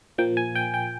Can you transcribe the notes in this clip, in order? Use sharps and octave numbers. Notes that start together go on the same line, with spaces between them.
A#2 F3 A#3 G5
G#5
G5
G5